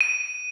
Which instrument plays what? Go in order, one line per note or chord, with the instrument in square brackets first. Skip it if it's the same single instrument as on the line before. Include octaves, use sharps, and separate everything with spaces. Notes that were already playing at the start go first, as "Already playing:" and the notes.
[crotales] D#7